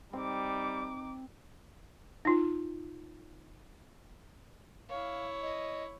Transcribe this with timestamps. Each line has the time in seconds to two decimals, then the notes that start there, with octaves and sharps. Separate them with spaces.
0.13 G3 C4 D#4 D6
2.25 D#4 F4
4.89 E4 C#5 F5
5.42 D#5